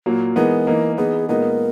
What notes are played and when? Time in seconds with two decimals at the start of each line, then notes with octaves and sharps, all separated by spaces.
0.06 A#2 F#3 A#3
0.36 E3 G#3 B3 D#4 A#4
0.67 E3 A#3 D#4
0.98 E3 B3 D#4 G#4
1.29 A#2 G#3 B3 D#4 A#4